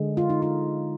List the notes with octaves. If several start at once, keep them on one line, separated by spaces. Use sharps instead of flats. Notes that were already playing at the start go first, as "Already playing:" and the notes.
Already playing: D3 G#3
F4
D#4
F4